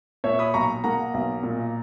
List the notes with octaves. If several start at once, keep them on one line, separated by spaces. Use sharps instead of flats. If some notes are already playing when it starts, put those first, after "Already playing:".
A#2 C#5 E5
B5 D#6
B1 A#5 C#6
A#3 F#5 A#5
B1
A#2